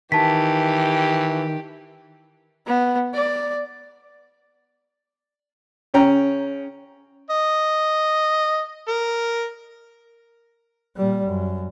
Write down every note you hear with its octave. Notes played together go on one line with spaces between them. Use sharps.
D#3 E3 G4 A5 B6
B3
D5
C#3 C#4 G5 A#5
D#5
A#4
A#2 G3
F#2